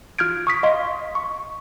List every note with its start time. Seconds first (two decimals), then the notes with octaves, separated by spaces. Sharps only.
0.19 F4 F6 G6 G#6 D7
0.47 C#6 D#6 B6
0.63 D#5 F5 C6 G#6
1.15 C#6